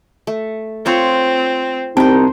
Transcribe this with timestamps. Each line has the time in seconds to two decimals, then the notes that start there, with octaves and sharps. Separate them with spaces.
0.27 A3
0.86 C4 F4 C5 C#5
1.97 C2 C4 D#4 C5 G5 A5